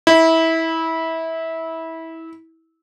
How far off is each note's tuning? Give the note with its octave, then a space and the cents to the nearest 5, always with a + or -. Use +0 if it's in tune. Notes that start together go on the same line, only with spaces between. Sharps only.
E4 -20